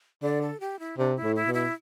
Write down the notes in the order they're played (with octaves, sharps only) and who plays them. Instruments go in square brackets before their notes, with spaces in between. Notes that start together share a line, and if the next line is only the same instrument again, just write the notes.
[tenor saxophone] D3 [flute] D5
[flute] A4
G4
E4
[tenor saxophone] C3 [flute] D4
[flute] E4
[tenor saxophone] A2
[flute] E4
[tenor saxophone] B2
[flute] E4